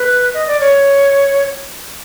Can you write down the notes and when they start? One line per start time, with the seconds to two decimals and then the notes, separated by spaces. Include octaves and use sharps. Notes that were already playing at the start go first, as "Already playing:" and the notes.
Already playing: B4
0.34 D#5
0.48 D5
0.60 C#5